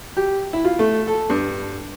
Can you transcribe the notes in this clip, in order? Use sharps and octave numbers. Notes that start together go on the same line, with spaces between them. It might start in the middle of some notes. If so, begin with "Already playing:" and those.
G4
E4
F4
A3
A4
G2